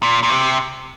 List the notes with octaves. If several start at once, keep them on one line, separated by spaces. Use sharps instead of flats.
A#2
A#2
C3